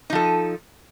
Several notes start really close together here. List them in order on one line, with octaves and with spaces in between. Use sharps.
D#4 F3 A4